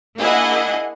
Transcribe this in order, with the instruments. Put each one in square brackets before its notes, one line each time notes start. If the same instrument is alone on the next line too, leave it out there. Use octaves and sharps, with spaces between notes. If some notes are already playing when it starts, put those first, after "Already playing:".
[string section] A#3 D4 E4 G#4 D#5 F#5